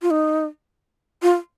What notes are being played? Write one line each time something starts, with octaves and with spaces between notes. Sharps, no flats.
F4
D#4
F4